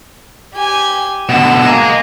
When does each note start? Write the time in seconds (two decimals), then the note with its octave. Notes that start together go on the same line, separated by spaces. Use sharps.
0.55 G4 G#5
1.29 B2 D3 E7
1.66 A#3 D#5 G#5